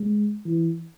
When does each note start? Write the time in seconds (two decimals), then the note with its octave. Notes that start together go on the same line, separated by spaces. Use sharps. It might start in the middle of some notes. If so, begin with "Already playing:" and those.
Already playing: G#3
0.45 E3